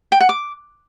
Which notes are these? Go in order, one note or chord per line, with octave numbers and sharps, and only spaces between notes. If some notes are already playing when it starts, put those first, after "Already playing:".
G5
F#5
D6